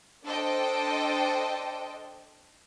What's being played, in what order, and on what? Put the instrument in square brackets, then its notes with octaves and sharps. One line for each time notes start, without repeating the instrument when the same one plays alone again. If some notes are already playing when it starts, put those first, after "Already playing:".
[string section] D4 A4 C5 D#5 G5